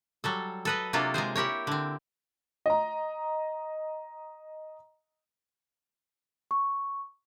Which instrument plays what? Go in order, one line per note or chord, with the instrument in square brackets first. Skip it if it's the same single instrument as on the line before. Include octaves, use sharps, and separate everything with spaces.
[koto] F#3 G3 A4
A4 B4 D#5
C3 F#3 A#3 D4 F4 A4
G#3 F4 G#4 C5
E4 G4 A#4 C#5
D3 C4
[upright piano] D#5 A#5
[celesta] C#6